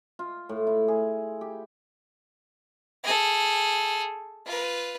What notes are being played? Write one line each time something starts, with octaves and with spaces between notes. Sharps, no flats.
F4
A2
E4
G#4
G4
G#4 A4
F4 B4